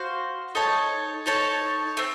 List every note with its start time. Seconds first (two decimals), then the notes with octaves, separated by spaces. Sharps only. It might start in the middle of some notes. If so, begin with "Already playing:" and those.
Already playing: F#4 C5 F5
0.55 D#4 A4 C#5 A5
1.26 D#4 A4 C#5 A5
1.97 A3 C4